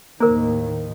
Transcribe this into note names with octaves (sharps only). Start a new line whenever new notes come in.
D#2 A2 D#3 A#3 A#4 C5